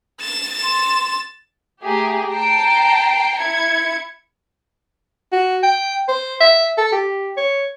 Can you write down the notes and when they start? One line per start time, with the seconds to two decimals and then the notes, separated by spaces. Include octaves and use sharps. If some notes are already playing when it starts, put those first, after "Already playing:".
0.21 A6 E7
0.63 C6
1.83 A3 G4 G#4 A#5
2.32 G5 A5 A#5 C7 D7
3.38 E4 G#6 C#7
5.32 F#4
5.63 G5
6.08 C5
6.41 E5
6.78 A4
6.92 G4
7.37 C#5